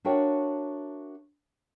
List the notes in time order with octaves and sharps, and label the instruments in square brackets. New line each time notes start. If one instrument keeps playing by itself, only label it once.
[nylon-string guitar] D4 F#4 A#4 C#5 E5 G5